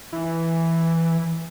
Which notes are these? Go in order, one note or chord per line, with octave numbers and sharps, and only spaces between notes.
E3